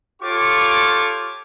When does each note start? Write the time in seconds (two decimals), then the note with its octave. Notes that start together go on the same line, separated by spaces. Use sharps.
0.23 F4 G4 A4 C#5 C#6 D6